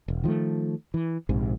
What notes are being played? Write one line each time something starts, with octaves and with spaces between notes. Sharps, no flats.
E1
D#3 F3 F#3 A3
E3
A#1 G#2 C3